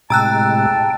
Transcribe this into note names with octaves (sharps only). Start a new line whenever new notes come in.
A2 C3 G#3 G5 A5 A#5 E6 F#6